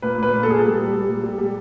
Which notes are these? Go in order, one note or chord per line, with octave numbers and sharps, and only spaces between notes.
A#2 B4
A#2 B4
A#2
A4
A#2 G#4
A4
G3
G3
G3
A#2
G3
G3